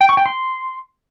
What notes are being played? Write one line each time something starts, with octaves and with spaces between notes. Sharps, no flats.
G5
C#6
G5
C6